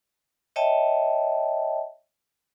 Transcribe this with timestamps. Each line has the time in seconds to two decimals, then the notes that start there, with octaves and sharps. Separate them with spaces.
0.56 C#5 D#5 E5 G5 A5